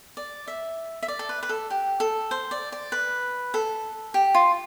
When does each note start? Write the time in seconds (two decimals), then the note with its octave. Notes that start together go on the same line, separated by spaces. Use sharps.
0.17 D5
0.48 E5
1.03 E5
1.08 D5
1.19 A4
1.29 B4
1.43 B4
1.49 A4
1.70 G4
2.00 A4
2.31 C5
2.51 D5
2.72 D5
2.92 B4
3.54 A4
4.14 G4
4.35 F4